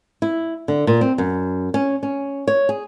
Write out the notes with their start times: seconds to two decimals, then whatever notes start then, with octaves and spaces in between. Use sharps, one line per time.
0.22 E4
0.68 D3
0.87 A#2
1.01 C4
1.18 F#2
1.74 C#4
2.03 C#4
2.47 C#5
2.69 G#4